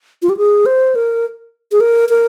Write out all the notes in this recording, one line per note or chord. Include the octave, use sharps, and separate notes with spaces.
F4
G4
G#4
C5
A#4
G#4
A#4
A#4